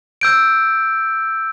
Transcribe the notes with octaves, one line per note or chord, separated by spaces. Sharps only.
E6 G6 D7